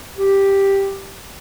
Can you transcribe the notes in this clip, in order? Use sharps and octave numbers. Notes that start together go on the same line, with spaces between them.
G4